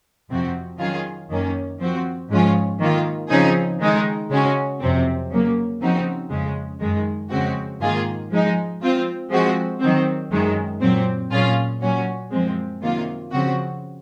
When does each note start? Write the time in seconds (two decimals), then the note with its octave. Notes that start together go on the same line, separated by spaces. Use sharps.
0.29 F2 C3 F3 C4 F#4
0.78 D#3 F#3 C#4 F4 G#4
1.29 F#2 D#3 A#3 C#4
1.79 F3 C4 F#4
2.29 G#2 F3 G#3 C#4 F4
2.79 D#3 A#3 F4
3.29 C#3 F3 C4 D#4 G#4
3.79 D#3 G#3 D#4
4.30 C#3 G#3 C#4 F#4
4.80 F2 C3 F#3 C4
5.30 C#3 F#3 A#3
5.80 C#3 F3 C4 D#4 F#4
6.30 F2 C#3 G#3
6.80 F#2 D#3 G#3
7.30 F2 C#3 G#3 C4 F#4
7.80 G#2 D#3 A#3 F4 G#4
8.30 F3 G#3 D#4
8.81 F3 C4 F4
9.30 F3 G#3 C4 F#4
9.81 D#3 F#3 C4
10.31 F#2 D#3 G#3
10.81 A#2 F#3 C4
11.30 A#2 F#3 C#4 F4 G#4
11.81 A#2 F#3 C#4 F#4
12.31 F#2 F3 G#3 C4
12.81 C3 D#3 F#3 A#3 F4
13.31 C#3 F3 C4 F#4